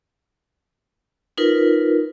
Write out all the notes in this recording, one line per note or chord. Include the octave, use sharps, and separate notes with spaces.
D#4 F4 A#4 B4